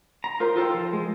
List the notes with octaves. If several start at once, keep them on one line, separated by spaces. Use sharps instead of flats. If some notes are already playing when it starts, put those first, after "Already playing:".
A#5
F4 A#4 C5
F4 A4 C5 G5
F3
G#3